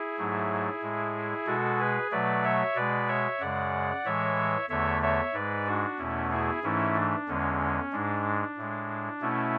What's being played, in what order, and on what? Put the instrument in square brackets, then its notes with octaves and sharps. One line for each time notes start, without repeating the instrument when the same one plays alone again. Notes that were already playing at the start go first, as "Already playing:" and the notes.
Already playing: [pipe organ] E4 G#4
G#2 F#3 A3
A2 G#3
B2 G#3 F#4 A4
G#4 B4
B2 F#3 A3 B4 D5
C#5 E5
B2 G#3 B4 D5
C#5 E5
F#2 C#3 G#3 D5 F#5
A2 E3 G#3 C#5 E5
E2 D3 A3 C#5 E5
C#5 E5
G#2 G#3 B4 D5
D4 F#4
E2 B2 A3 C#4 E4
E4 G#4
G#2 E3 A3 C#4 E4
D4
E2 D3 G#3 C#4
G#2 G#3 D4
A2 G#3
B2 A3 C#4 E4